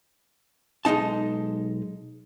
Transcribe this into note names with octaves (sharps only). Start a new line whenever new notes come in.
B1 G#3 C4 D#4 A5